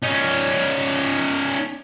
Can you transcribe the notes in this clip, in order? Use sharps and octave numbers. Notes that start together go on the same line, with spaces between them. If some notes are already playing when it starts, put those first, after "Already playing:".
C#4 D#4